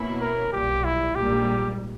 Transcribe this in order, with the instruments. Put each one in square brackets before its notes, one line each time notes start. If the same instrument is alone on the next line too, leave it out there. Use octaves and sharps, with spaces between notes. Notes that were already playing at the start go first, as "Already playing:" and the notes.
Already playing: [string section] B2 A#3 C#4 E4
[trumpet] A#4
[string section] B1 A#2 G3 [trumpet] G4
[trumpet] E4
[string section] A#1 G#2 G3 A#3 [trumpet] G4